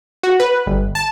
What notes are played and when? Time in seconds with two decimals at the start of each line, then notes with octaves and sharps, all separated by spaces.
0.23 F#4
0.40 B4
0.67 G1
0.95 A5